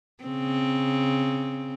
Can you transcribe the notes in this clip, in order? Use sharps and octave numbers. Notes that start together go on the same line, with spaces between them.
C#3 C4